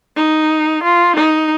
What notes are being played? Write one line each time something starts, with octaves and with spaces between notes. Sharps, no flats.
D#4
F4
D#4